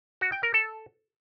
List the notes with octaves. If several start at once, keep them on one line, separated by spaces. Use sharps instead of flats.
F#4
G5
A#4
A4